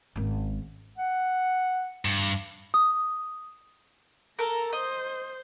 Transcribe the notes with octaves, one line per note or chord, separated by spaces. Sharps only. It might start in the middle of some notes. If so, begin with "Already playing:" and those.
G#1 C#4
F#5
G2
D#6
A4 A#4 A#5
C5 D#5